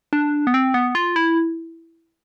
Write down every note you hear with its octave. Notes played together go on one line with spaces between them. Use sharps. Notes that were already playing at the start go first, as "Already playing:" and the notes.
D4
B3
C4
B3
F4
E4